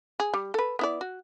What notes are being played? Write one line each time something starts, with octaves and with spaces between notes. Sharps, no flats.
G#4
G3
A4 B4
B3 E4 D5
F#4